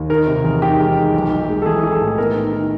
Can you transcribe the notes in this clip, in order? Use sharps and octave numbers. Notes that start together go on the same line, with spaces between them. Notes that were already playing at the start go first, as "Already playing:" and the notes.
Already playing: D#2
D#3 A#4
C3
E2
D#3 G4
G#3
D#3
B1
B1
G#3
A4
E3 G#4
E3
A4
A2
B3 A#4
D#3
D#3